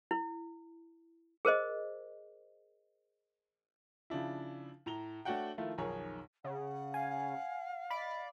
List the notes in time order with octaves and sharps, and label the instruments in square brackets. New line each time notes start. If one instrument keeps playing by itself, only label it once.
[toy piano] E4
G#4 A#4 C5 D#5
[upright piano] C#3 F3 D4 E4
A2 A#5 F7 G7
A3 D4 F#4 C#5 F#5 G5
D#3 F3 A3 E4 F4
B1 F2 D#3 G#4 A#4 C#5
[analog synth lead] C#3 [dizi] F#5
[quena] F5 [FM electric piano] G#5
[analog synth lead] D5 [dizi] D#5 [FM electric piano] B5